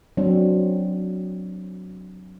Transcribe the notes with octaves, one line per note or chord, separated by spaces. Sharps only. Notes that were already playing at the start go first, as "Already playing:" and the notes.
F#3 C4 D4